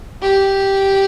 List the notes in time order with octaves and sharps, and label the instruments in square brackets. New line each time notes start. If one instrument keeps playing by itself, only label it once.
[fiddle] G4